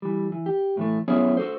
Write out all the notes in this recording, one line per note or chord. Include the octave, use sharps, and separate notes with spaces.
E3 G3
E3
G4
A2 E3 A3
F#3 B3 C#4 E4 G#4 C#5
F#4 G4 A4 C5